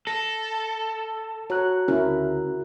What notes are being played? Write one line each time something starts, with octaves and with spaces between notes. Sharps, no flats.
A4 A#6
F#4 C#5 A#5 F#6
D2 C#3 B3 C#4 E4 A#4